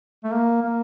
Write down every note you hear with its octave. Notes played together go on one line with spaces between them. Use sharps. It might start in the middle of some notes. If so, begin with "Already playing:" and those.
A3
A#3
A#3